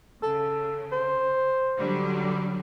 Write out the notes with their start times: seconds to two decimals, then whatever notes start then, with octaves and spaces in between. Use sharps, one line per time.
0.23 C#3 A4
0.92 C5
1.78 D3 F#3 G3